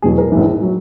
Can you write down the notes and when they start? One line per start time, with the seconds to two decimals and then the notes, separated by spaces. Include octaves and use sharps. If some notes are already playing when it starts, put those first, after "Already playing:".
0.02 E1 E2 B2 F#3 G#4
0.18 A#4
0.32 A#1 G#2 E3
0.62 F#3